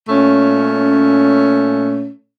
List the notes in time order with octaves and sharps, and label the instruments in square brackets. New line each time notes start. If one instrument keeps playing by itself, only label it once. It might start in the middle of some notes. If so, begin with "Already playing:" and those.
[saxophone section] A#2 A3 C#4